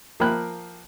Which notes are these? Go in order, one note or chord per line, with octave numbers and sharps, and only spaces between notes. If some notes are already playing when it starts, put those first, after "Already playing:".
F3 A#3 A#4 G5 B5 F#6